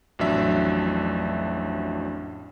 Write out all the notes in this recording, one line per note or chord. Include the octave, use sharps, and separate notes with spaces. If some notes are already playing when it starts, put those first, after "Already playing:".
A1 F2 F#3 D4 E5